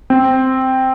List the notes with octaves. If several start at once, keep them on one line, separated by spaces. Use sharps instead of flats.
C4